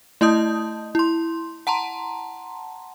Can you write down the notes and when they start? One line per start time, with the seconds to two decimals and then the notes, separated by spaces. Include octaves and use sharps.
0.21 A3 E4 D#5 A5 D#6 G6
0.95 E4 C6
1.67 F#5 A5 A#5 C6